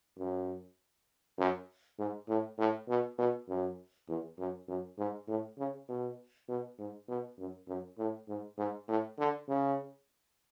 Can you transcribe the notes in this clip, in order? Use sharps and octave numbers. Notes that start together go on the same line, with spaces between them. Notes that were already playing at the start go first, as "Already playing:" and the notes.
F#2
F#2
G#2
A2
A2
B2
B2
F#2
E2
F#2
F#2
G#2
A2
C#3
B2
B2
G#2
B2
F#2
F#2
A2
G#2
G#2
A2
D3
C#3